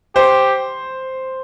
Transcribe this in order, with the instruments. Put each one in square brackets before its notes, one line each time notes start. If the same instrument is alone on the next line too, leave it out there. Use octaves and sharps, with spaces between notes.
[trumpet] G4 [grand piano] C5